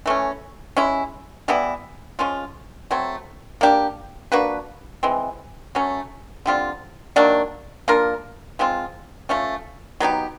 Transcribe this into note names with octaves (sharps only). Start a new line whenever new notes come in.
E3 A3 C#4
G#3 C#4 E4
E3 G3 B3 E4
F3 G#3 C#4 F4
F#3 A3 C4
A#3 D4 G4
A#3 D4 F#4 B4
E3 G#3 C4
F#3 A3 C#4
D3 G3 C4 F4
D#3 F#3 A#3 D4
A#3 D4 F4 A#4
F3 G#3 C4 F4
F3 A3 C#4
F#3 B3 D#4 G4